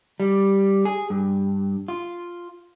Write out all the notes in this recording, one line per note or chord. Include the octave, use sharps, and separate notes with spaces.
G3
G#4
G2
F4